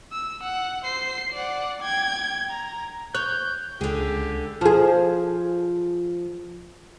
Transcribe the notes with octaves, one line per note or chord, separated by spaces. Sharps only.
E6
F#5
C5 C7
D5 F#5
G5 G#6
A#5
C#5 F#6 G6
C#2 D3 G4 G#4
F3 G#4